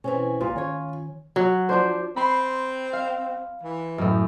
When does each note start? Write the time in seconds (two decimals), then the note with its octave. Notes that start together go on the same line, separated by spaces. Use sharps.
0.04 B2 E3 C4 C#4
0.41 A#1 A#2 F4
0.56 D#3 C#4 C#5
1.36 F#3
1.69 F3 D4 C5
2.16 C4 B5 C6
2.93 F5
3.63 E3
3.98 F#2 A2